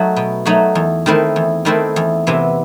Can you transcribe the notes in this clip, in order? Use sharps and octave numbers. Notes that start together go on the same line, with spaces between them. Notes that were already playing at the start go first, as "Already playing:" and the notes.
Already playing: F#3 A3 D#4 F#4
B2
F#3 A3 D#4 F#4
E2
D#3 A3 C4 E4
E2
D#3 A3 C4 E4
E2
C3 E3 B3